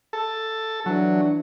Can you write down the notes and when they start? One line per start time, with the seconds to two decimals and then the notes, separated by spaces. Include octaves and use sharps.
0.13 A4
0.86 E3 F#3 D4